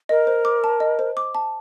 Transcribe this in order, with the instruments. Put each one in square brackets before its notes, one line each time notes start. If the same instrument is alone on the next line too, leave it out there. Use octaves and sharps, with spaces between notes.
[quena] A#4 [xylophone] D#5
[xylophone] C5
D6
A5
D#5
C5
D6
A5